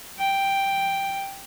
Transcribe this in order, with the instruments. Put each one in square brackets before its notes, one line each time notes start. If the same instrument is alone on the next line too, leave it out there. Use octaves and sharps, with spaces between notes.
[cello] G5